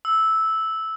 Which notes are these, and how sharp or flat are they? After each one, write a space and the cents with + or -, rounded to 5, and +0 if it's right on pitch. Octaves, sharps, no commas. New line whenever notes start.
E6 -10